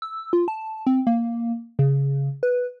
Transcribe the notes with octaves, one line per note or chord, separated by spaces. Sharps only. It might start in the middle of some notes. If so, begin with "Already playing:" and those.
E6
F4
A5
C4
A#3
C#3
B4